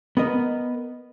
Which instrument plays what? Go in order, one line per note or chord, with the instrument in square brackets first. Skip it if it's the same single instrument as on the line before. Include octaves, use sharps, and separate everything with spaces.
[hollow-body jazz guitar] B3 A#4 D#5